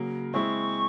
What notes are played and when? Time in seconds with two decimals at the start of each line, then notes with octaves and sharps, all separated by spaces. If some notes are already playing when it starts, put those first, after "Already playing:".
Already playing: C#3 F#3 A#3
0.33 G#3 C4 E4 C#6